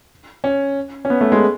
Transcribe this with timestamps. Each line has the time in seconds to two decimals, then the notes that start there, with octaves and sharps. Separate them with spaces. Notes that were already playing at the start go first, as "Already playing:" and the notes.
0.44 C#4
1.05 C#4
1.10 B3
1.21 A3
1.32 G#3